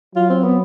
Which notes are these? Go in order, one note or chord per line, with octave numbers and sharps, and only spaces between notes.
F#3 F4
C4
B3